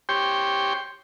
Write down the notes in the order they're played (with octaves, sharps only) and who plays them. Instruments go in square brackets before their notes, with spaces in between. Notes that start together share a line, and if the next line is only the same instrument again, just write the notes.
[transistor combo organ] G4 C#5 G5 C6